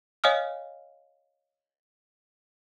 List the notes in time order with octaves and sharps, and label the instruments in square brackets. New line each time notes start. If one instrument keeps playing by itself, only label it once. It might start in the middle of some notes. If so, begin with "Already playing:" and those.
[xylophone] C#5 D#5 F5 G#5 D#6 F6